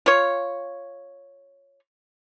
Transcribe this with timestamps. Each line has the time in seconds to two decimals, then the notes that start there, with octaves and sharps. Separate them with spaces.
0.06 F4 C#5